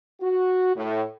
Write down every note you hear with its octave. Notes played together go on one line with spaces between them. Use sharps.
F#4
A2